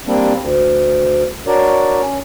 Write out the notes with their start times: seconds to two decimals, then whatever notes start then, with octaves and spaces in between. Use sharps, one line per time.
0.07 G3 A#3 C4 D4
0.39 D2
1.47 D4 F#4 A#4 C#5 D5
2.01 C#4